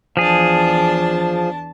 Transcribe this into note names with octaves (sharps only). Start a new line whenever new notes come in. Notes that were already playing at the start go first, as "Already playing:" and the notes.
E2 F3 D4 G#4 A5